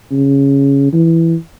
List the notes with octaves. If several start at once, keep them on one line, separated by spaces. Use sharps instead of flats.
C#3
E3